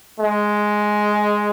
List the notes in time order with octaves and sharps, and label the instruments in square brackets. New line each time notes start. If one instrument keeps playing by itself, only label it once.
[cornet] G#3